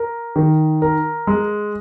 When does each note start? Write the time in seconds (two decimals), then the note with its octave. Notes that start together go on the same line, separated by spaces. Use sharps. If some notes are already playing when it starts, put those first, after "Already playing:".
Already playing: A#4
0.36 D#3
0.82 A#4
1.27 G#3